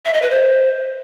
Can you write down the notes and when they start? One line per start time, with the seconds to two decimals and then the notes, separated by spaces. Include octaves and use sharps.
0.05 E5
0.14 D#5
0.22 B4
0.30 C5